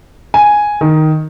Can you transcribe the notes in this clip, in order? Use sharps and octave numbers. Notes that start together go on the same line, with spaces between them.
G#5
D#3